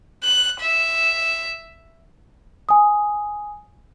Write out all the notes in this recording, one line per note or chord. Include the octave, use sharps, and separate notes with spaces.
F#6
E5
G#5 D#6